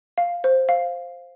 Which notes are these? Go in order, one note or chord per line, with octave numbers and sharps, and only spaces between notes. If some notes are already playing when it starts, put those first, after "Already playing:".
F5
C5
F5